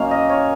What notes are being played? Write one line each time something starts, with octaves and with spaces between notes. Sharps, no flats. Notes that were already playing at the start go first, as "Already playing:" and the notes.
Already playing: F#2 D#3 A#3 C#4 F5
D#5
C#5